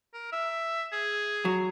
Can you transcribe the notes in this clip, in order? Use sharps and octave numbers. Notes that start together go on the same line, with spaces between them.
A#4
E5
G#4
F#3